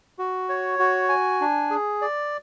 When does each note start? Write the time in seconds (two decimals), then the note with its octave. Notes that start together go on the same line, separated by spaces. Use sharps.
0.19 F#4
0.49 C#5
0.79 F#4
1.09 G#5
1.41 D4
1.71 G#4
2.02 D5